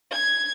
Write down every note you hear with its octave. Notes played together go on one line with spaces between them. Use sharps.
G#6